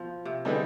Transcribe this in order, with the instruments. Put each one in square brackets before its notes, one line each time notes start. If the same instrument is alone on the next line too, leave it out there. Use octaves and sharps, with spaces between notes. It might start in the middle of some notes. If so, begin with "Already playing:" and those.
Already playing: [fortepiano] B2 [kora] F3
[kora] C3
[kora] D3 [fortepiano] G3 C4 D#4 G#4 B4